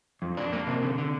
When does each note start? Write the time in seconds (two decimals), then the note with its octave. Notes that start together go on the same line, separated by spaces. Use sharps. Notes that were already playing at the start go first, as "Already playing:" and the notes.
0.22 F2
0.37 D4
0.53 A#3
0.67 C3
0.83 D3
0.98 D3